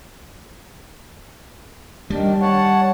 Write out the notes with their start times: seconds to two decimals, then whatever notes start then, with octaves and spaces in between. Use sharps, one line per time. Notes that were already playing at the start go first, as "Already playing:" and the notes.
2.10 D#3 G3 D4
2.41 C#5 F#5 A5